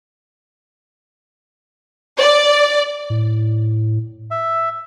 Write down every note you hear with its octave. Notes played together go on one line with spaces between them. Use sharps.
D5
A2
E5